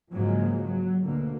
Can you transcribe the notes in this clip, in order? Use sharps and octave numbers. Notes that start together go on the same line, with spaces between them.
G#2 C#3 F3 F#3 G#3 A#3
F#3
D2 B2 D3 A#3